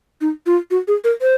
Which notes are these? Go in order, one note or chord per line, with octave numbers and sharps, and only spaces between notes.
D#4
F4
F#4
G#4
A#4
C5